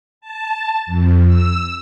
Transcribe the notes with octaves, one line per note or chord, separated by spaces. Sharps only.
A5
F2
E6